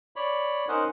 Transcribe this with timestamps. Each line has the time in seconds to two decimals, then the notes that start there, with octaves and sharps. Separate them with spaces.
0.16 C#5 D5 B5
0.68 C#4 D#4 A#4 C5 D#5 F#5